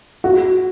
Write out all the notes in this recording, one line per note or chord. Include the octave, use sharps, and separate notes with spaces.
F#4